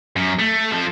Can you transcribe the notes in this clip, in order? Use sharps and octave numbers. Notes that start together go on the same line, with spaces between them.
F#2
A3
F3 A4